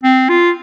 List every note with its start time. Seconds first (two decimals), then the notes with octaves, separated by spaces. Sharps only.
0.03 C4
0.29 F4